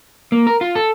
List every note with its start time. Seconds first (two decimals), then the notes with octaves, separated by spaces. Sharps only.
0.32 A#3
0.47 A#4
0.61 F4
0.75 A4